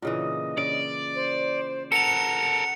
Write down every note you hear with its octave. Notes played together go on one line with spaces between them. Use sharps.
A#2 C#3 E3 D#5
C#3 D5
C5
A4 A#4 F#5 C#7 F7